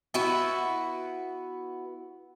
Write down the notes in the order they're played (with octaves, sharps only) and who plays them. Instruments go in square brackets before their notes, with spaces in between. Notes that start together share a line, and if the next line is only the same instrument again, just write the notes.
[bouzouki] B3 E4 F#4